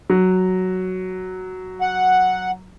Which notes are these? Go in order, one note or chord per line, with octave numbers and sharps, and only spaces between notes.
F#3
F#5